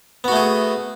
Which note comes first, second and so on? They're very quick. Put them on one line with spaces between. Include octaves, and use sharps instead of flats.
B3 F#4 A3 G#4